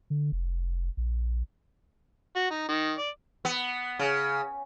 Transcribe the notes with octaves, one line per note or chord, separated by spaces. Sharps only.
D3
F1
A#1
F#4
D#4
D#3
D5
B3
C#3